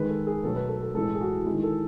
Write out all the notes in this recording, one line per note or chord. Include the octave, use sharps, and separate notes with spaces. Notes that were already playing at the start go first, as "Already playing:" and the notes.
Already playing: D#3 G#3 B4
A4
G#4
B2 F#3 A3 A4
B4
A4
A4
A2 E3 G#3 A4
G#4
F#4
D#3 G#3 E4
A4